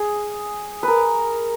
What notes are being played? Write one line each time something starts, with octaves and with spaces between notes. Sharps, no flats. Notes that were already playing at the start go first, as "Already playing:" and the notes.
Already playing: G#4
A#4 B4